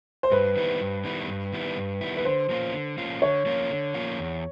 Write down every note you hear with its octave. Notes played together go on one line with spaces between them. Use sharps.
C5
G2 B4
D#3 G3 B3 E4
G2
D#3 G3 B3 E4
G2
D#3 G3 B3 E4
G2
D#3 G3 B3 E4
B4
D3 C5
F3 A#3 C#4 F4
D3
F3 A#3 C#4 F4
D3 C#5
F3 A#3 C#4 F4
D3
F3 A#3 C#4 F4
E2